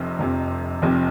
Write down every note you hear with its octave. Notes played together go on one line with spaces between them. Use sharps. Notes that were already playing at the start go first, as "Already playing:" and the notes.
Already playing: F1 F2 C3
F1 F2 C3
F1 F2 C3